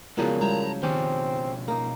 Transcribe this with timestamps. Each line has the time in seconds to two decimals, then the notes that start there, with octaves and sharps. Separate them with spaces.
0.18 A#2 C#3 F3 F#3 G#3 B3 E4
0.42 G3 G#3 E4 A5 A#5
0.83 B2 D#3 F3 C4 C#4 G4
1.68 A#3 D#4 A#4 F5